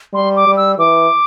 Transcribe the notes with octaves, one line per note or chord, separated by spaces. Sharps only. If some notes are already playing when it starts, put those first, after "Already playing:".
G3 C6
D6
G3
E6
E3 D6